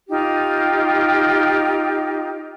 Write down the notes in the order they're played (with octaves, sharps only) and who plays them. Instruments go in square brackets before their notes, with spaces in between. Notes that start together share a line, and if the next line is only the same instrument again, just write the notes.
[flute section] D#4 F4 G4